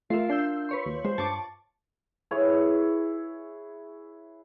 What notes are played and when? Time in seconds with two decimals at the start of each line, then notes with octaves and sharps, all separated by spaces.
0.10 A3 F4 A#4 E5 C7
0.30 D4 E6 G6 C7
0.69 B4 C#5 C6
0.86 D#2
1.04 G#3 C5
1.18 G2 A5 C#6 D6
2.31 E4 G#4 B4 C#5